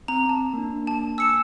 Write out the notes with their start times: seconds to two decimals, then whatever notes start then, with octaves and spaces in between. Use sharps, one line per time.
0.08 C4 A#5
0.29 A5
0.53 A#3 D4
0.87 A5
1.18 G#5 D6 E6 C#7 E7